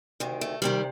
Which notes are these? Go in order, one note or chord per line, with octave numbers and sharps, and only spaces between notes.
D2 C3 D#3
A3
D2 C3 D#3 G3